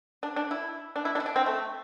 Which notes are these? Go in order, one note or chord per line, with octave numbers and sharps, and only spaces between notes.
D4
D4
E4
D4
E4
D4
E4
D4
C4
A3